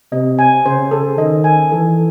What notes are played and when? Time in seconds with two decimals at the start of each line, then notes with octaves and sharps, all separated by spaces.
0.12 C3 D#5
0.39 G#5
0.66 C#3 C5
0.91 A4
1.18 D#3 D#5
1.44 G#5
1.72 E3 A4